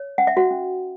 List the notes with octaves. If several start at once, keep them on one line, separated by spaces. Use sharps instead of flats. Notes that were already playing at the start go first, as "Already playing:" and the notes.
Already playing: C#5
C#4 F#5
E5
F#4 F#5
C#4